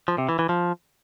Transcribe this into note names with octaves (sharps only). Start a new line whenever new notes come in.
F3
C3
E3
E3
F3